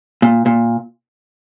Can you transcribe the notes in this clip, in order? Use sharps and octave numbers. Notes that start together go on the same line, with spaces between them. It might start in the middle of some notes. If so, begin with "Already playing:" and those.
A#2
A#2